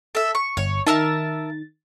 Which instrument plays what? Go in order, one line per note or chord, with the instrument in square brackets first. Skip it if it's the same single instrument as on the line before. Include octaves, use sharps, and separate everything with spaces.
[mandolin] A4 E5
C#6
[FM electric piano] G1 C#7 [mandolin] C#5
[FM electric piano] D#3 A6 [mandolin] A#4 E5 A5